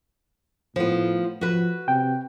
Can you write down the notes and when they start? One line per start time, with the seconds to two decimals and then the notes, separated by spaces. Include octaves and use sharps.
0.76 A2 F3 B3
1.41 F3 F#4 B4
1.88 C3 G5